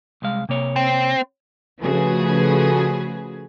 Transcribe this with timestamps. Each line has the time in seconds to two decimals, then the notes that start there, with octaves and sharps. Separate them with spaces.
0.22 C2 G#3 F5
0.49 C3 A#3 C#5
0.76 C4
1.80 C#3 F3 A3 F#4 G#4 B4